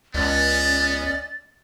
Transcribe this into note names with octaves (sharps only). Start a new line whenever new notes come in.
C#2 B3 C#4 D5 D#5 A6